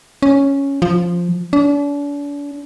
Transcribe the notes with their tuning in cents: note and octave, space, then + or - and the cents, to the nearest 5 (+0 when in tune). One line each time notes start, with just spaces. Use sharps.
C#4 +0
F3 +0
D4 -40